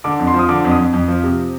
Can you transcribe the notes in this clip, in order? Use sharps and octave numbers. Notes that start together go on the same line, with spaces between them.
D3 D6
F2
C6
F3
D#6
D3 D6
F2
D#6
F2
F2
F3
C3